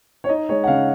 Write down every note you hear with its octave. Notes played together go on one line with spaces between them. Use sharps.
C#5
D#4 D#5
G#3 C#5
F#5
C#3 F5